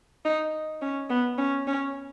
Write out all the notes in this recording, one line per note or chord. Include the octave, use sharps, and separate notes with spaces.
D#4
C#4
B3
C#4
C#4